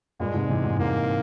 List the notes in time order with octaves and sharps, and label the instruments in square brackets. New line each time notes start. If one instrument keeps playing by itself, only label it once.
[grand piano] G2 A#2 [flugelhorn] G#3
[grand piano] G#2 C3
C3 E3
G#2
[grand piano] G#2 [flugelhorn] A#3